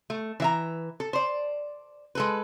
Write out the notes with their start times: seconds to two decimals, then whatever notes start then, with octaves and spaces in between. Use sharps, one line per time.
0.10 A3
0.40 E3 E5 A#5
1.00 A4
1.13 C5 D5
2.15 G#3 A4 B4